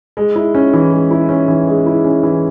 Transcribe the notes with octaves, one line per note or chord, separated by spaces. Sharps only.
G#3
E4
C#4
E3
G#3
E4
C#4
E3
G#3
E4
C#4
E3